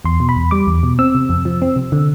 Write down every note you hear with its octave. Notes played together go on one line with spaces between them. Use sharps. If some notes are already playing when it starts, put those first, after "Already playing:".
E2 C6
B2
B5
E2
G3 D6
E2
B2
C4 E6
C3
F2
F3
C4
C3
D3